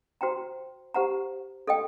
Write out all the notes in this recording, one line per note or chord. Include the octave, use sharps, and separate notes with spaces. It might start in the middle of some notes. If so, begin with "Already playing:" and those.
F#4 C5 G5 A#5
G4 C5 F#5 A#5
A4 D#5 G5